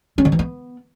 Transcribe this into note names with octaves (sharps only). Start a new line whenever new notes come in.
C#4
D3
E3
B3